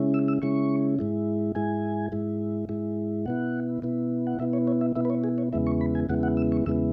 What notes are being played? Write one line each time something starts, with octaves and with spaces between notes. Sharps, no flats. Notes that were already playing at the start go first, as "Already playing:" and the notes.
Already playing: C#3 G#3 C#4 E4
E6
E6
C#3 G#3 C#4 E4 C#6
G#2 G#3 E4
G#2 G#3 E4 G#5
G#2 G#3 E4
G#2 G#3 E4
B2 B3 E4 F#5
B2 B3 E4
F#5
B2 B3 E4 E5
C#5
C#5
E5
B2 B3 E4 E5
B4
C#5
G#4
C#5
E2 C#3 G#3 B3 E4 E5
C#6
B5
G#5
E2 C#3 G#3 B3 E4 F#5
F#5
E6
C#6
E2 C#3 G#3 B3 E4 E6